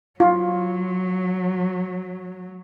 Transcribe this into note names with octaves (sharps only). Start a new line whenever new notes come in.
F#3 F4